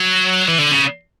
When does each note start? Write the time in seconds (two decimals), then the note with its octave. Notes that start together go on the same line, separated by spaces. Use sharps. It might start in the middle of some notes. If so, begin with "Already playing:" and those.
Already playing: F#3
0.48 E3
0.59 D3
0.72 C#3